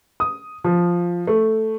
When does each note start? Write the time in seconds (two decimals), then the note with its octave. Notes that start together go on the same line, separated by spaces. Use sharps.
0.20 D#6
0.64 F3
1.27 A3